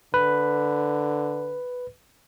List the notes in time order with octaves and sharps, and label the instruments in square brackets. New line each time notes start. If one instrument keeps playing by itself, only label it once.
[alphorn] D3 [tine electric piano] B4